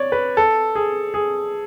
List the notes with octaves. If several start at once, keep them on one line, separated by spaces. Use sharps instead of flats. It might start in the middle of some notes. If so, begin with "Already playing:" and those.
Already playing: C#5 D5
B4
A4
G#4
G#4